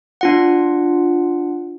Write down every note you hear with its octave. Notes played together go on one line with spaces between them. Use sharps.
D4 F4 F#5